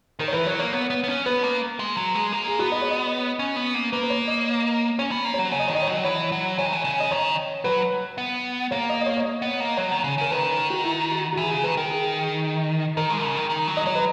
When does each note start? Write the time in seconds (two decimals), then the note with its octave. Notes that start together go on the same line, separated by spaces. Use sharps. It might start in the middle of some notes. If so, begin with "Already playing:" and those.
0.19 D#3 A#4
0.28 C#5
0.32 E3 B4
0.46 F#3 C#5
0.59 A#3 C#5
0.73 B3
0.90 B3
1.04 B3
1.08 C#4
1.25 B3 B4
1.44 A#3
1.80 G#3
1.97 F#3
2.15 G#3
2.32 A#3
2.48 G#4
2.59 B3 F#4
2.72 D#5
2.82 C#5
2.91 D#5
3.39 C#4
3.56 B3
3.74 A#3
3.92 A#3 B4
4.03 B4
4.10 C#5
4.28 D#5
4.99 C#4 C#5
5.12 B3
5.25 A#3
5.34 C#5
5.39 F#3
5.52 C#3 C#5
5.60 D#5
5.68 D#3 C#5
5.75 D#5
5.83 C#5
5.87 F#3
6.04 E3 C#5
6.32 F#3
6.58 E3 C#5
6.65 D#3
6.73 E3
6.84 C#3
7.00 D#5
7.11 D#3 C#5
7.64 F#3 B4
8.18 B3
8.71 A#3 C#5
8.89 D#5
9.01 D#5
9.06 C#5
9.17 C#5
9.25 D#5
9.42 B3
9.60 A#3
9.77 F#3 C#5
9.91 D#3
10.04 C#3
10.18 C#3 A#4
10.31 D#3 B4
10.45 B4
10.58 A#4
10.70 F#4
10.84 E4
11.11 F#4
11.33 F#4
11.37 E3 G#4
11.50 C#3 G#4
11.63 D#3 B4
11.77 D#3 A#4
11.90 G#4
12.97 D#3 A#4
13.10 G#3
13.24 C#3
13.37 D#3
13.50 D#3
13.67 F#3
13.77 D#5
13.86 F#3 C#5
13.95 B4